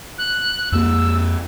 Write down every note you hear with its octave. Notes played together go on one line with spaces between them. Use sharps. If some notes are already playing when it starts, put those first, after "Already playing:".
F#6
F2 A#3 E6